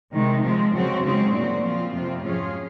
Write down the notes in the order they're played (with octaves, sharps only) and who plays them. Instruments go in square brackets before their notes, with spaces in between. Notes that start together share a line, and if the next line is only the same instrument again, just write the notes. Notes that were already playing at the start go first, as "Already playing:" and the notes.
[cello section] C3 D#3 G#3
F3 G#3 C4
C#3 F#3 C4 F#4
C#3 G#3 C4 D#4
A#2 F#3 C4 F#4
F3 C4 F4
F2 C3 F3 C4 F4
G#2 F#3 C#4 F4 G#4